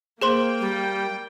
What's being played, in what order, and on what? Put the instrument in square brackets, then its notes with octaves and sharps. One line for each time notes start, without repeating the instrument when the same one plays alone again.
[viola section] A#3 [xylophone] G#4 C5 C6 [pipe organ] G5
[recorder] G3